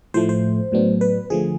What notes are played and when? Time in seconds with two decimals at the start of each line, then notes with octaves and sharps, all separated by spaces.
0.14 A2 F3 A3 C5
0.29 C5
0.72 A2 F#3 B3 D4
1.01 B4
1.30 D3 F3 A3 G#4